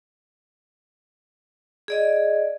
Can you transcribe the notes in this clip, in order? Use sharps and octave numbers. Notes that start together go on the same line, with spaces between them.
G#4 D5 D#5